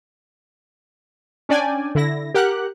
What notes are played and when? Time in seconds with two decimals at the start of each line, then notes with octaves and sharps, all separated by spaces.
1.49 C#4 D4 D5 G5 G#5
1.95 D3 E4 A#6
2.34 G4 A#4 F#5 F#6